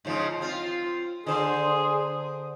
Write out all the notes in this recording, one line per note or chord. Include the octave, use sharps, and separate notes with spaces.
G#2 C#3 F3
C4 F4
D3 G#4 C5